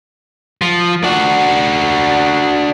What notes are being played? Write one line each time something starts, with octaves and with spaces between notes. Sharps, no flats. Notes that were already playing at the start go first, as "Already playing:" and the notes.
F3
D4 F#4